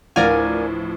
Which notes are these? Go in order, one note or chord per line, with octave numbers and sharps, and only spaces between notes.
A1 D2 A2 F3 A#4 D5 F5 G#5